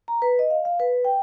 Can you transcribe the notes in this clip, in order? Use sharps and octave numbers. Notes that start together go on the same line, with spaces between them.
A#5
B4
D#5
F5
F5
B4
G5